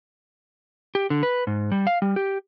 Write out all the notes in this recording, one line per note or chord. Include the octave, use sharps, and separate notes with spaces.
G4
D3
B4
G#2
G3
F5
G3
G4